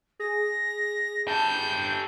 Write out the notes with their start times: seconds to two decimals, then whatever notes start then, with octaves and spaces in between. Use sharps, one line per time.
0.20 G#4 A#6
1.28 G4 A4 A5 G6